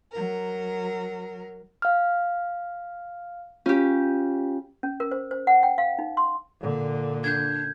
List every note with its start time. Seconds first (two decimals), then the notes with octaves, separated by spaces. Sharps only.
0.11 F#3 A#4
1.82 F5 F6
3.66 C#4 F4 G4
4.83 C#4
5.00 A#4
5.11 C5
5.31 C5
5.47 F#5
5.63 G5
5.78 F5
5.99 D#4
6.17 C6
6.60 A#2 D3
7.24 D4 G6 G#6